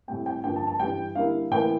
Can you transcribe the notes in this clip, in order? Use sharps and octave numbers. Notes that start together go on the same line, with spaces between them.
A2 G3 C4 G5
G5
G2 D3 F3 A#3 G5
A5
A5
G2 E3 G3 G5
D3 G3 A#3 E4 F5
A2 E3 A#3 G5